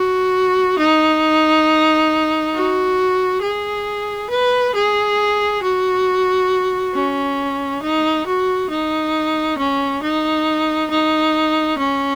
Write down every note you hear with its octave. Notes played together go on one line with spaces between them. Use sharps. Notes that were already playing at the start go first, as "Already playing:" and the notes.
Already playing: F#4
D#4
F#4
G#4
B4
G#4
F#4
C#4
D#4
F#4
D#4
C#4
D#4
D#4
C#4